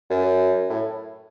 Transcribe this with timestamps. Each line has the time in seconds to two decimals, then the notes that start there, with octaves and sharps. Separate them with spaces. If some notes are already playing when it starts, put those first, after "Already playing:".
0.10 F#2
0.70 A2